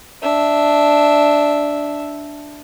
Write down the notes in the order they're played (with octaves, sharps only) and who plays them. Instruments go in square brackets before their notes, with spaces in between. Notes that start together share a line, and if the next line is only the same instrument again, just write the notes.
[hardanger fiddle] D4 E5